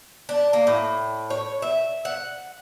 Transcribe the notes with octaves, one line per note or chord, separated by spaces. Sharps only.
D4
A#3
A2
C#5
E5
F#5